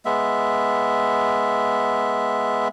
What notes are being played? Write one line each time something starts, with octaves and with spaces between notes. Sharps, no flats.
G#3 B3 E5